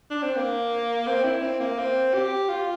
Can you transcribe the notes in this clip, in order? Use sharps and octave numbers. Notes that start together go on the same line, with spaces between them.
D4
C4
A#3
C4
E4
C4
A#3
C4
G4
F4